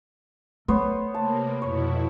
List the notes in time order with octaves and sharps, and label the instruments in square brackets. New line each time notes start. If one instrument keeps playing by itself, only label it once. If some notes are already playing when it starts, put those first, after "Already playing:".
[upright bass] A3 [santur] B3 C5 C#5
[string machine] C3 A#3 [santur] A5
[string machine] F2 B2 E4 [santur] C#5